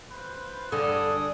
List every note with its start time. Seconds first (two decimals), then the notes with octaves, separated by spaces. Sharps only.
0.11 F4 B4 C5
0.72 G2 D3 G#4 D#6